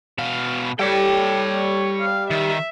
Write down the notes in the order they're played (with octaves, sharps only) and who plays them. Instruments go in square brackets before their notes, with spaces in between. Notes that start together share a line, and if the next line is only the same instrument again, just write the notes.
[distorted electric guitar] B2 F5
[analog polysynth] G3 [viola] G4 A4 [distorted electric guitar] C#5 G5
[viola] F5
[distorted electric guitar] D#3 [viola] E5